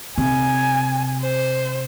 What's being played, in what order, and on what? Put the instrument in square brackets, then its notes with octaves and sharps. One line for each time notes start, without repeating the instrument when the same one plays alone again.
[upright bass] C3 [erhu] G#5
[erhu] C5